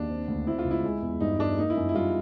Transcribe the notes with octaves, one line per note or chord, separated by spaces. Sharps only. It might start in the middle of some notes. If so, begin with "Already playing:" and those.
Already playing: D#2 D4
C4
D2
C4 E4
F4
C#2
E4
G#3
E2
G2 D#4
G2 D4
A#3 D#4
E4
F#2
E4
G3 F4